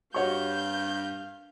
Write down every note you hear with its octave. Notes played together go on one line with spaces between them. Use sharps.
G2 F#4 C#5 F5 C#6 G6